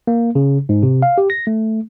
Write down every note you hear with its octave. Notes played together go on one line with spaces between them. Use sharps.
A#3
C#3
G#2
C3
F5
G4
A#6
A3